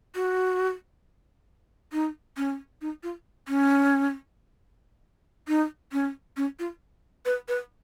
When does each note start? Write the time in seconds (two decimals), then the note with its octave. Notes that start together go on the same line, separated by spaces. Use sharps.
0.15 F#4
1.93 D#4
2.37 C#4
2.82 D#4
3.03 F4
3.48 C#4
5.48 D#4
5.92 C#4
6.37 C#4
6.59 F4
7.25 B4
7.48 B4